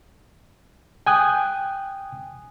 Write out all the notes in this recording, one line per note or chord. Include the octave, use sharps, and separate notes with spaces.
G5 G#5 D#6 F#6